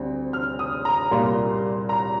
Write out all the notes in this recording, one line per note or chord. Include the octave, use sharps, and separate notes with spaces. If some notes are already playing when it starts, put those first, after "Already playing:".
Already playing: D2 D3 G3 C4
F6
D#6
A#5
C2 A#2 G3 A#3 C6
A#5